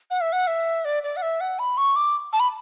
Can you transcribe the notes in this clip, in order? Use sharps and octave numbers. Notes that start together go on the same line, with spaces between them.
F#5
E5
F#5
E5
D5
D5
F#5
E5
F#5
B5
C#6
D6
A5
B5